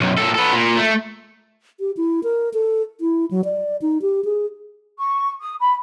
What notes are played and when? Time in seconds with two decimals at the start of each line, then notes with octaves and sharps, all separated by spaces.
0.01 B1 F#2
0.18 A#2 A4
0.35 B3 A4
0.53 A#2
0.77 A3
1.80 G4
1.97 E4
2.24 A#4
2.54 A4
3.01 E4
3.31 F#3
3.44 D5
3.82 D#4
4.02 G4
4.25 G#4
5.00 C#6
5.41 D#6
5.60 B5